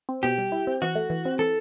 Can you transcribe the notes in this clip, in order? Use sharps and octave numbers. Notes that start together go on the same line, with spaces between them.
C4
B2 G4
G3
E4
C4
E3 F#4
A3
E3
C4
E3 A4